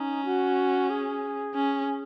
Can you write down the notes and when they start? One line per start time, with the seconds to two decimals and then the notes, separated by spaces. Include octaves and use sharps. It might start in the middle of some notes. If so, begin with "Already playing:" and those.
Already playing: C#4 D#4
0.25 F#4
0.90 G#4
1.54 C#4